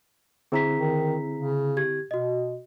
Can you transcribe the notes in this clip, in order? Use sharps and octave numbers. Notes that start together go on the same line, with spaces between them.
D3 C4 E4 G#4 A#5 B6
D#3
C#3
G4 G#6
B2 F#4 D#5